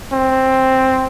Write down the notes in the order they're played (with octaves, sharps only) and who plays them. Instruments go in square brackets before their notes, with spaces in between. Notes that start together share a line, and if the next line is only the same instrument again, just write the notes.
[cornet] C4